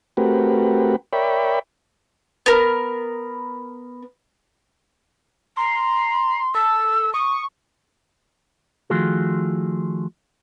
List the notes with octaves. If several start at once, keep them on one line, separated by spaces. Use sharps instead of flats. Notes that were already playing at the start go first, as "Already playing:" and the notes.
A3 C4 F#4 G4 A#4 B4
A#4 C#5 D5 E5 G5 B5
B3 A#4
A#5 C6
A4 E6
C#6 D#6
D#3 F3 A3 F4 F#4 G#4